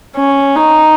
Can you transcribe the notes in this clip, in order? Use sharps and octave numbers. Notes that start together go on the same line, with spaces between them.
C#4
D#4